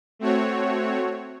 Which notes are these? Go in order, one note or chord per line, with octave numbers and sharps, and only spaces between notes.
A3 C4 F#4 C#5